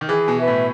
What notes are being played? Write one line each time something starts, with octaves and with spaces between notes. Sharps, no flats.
D#3
E3 G#4
B2
B4 E5
A2